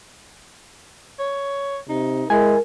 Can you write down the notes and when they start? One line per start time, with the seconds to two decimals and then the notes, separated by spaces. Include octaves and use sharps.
1.19 C#5
1.89 C3 D#4
2.30 G#3 E4 A#4 G#5